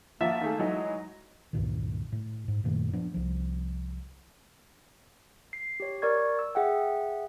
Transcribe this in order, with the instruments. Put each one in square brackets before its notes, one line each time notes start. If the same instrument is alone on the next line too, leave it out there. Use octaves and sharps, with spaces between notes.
[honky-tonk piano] F3 F#4 [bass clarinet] A#3 [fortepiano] E5
[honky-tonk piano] D#3 A3 G#4
[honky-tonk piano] E3 F#3 D#4 [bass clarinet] G#3
[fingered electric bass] C#2 G2 A#2 D#3
A2
G#2
F#2 A#2 D#3 A3
F3 B3 D4
C2 F3
[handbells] C7
G4 C#5
A#4 D5 C#6 G#6
E6
G#4 E5 F#5 G5